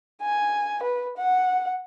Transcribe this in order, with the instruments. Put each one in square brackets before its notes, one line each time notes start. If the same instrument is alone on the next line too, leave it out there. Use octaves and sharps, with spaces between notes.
[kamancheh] G#5
B4
F#5